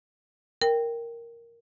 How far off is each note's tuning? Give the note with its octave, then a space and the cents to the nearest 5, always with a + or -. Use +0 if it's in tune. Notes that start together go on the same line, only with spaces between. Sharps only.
A#4 +0 G5 +0